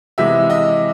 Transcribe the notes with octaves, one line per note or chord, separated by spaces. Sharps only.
C3 E3 G#3 E5
D#5